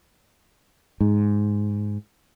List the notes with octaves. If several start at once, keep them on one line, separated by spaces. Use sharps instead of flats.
G#2